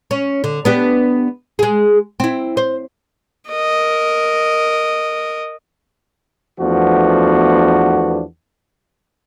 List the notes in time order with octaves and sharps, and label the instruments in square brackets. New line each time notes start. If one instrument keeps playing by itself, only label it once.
[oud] C#4
D3
B3 D4 G4
G#3 G#4
C4 E4
C5
[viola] A#4 D#5
[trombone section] E2 F3 A3 B3 D4 F#4